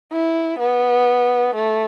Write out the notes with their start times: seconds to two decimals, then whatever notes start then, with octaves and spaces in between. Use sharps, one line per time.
0.12 E4
0.59 B3
1.55 A3